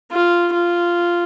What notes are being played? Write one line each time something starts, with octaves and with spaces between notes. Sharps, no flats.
F4
F4